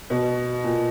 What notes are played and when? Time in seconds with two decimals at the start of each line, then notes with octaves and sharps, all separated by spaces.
0.10 B2
0.64 A#2